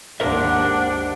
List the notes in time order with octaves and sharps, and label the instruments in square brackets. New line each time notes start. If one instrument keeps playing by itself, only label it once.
[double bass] G#1 D#2 [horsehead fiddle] D4 [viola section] G4 F#5 [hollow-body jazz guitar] A#4 C5 E5